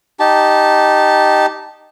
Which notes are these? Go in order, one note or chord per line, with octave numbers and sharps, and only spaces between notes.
D#4 G4 A5